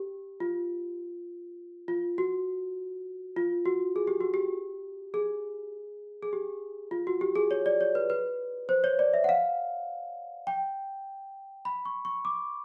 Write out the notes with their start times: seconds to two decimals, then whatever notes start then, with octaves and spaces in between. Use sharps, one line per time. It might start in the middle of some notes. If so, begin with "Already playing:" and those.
Already playing: G4
0.40 F4
1.88 F4
2.18 F#4
3.36 F4
3.65 F#4
3.96 G#4
4.07 G4
4.21 F#4
4.34 G4
5.14 G#4
6.23 G#4
6.33 G4
6.91 F4
7.07 F#4
7.21 G4
7.36 G#4
7.51 C#5
7.66 D5
7.81 C#5
7.95 B4
8.10 B4
8.69 C5
8.84 C#5
8.99 D5
9.14 E5
9.24 F#5
9.29 F5
10.47 G5
11.65 B5
11.85 C#6
12.05 C#6
12.25 D6